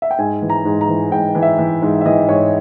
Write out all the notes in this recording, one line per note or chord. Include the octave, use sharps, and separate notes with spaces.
E5
G5
G#2 G#5
E3
A#5
G#2
A#5
E3
G#2 G5
E3
E5
E3
G#2
E5
E3 D#5
G#2 C#5